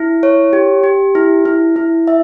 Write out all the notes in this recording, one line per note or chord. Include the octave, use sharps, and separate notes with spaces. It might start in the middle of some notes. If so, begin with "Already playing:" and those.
Already playing: E4
C#5
G4
G4
E4
E4
E4
E5